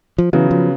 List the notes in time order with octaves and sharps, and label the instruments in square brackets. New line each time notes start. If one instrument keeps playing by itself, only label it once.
[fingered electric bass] F3
[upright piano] C#3 F#3 B3 [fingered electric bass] E3
[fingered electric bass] F3